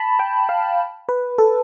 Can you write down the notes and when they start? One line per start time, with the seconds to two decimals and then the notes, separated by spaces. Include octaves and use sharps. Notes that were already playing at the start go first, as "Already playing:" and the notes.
Already playing: A5 B5
0.19 G5
0.49 F5
1.09 B4
1.38 A4